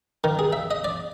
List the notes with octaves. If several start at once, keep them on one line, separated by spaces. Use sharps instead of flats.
D#3
G#4
E5
D#5
D5